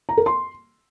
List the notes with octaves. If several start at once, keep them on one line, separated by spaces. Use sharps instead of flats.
A#5
A#4
C6